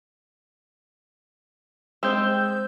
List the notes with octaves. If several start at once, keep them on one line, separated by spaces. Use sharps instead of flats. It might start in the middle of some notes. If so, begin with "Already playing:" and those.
G#3 C4 E6 G6